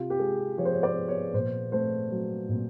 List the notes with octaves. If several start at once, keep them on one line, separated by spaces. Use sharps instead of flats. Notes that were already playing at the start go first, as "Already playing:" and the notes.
Already playing: C3 F4
G4
G#3 G#4
F3 C#5
C5
C#5
D5
B3
C#5
A#2 C5
A3 C5
F#3
A#2